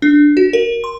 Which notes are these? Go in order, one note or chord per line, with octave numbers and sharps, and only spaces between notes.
D4
F#4
A#4
C6